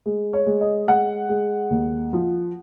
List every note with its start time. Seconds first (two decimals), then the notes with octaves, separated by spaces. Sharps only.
0.06 G#3
0.33 C#5
0.46 G#3
0.61 D#5
0.88 G#3 F#5
1.29 G#3
1.70 D#2
2.13 F3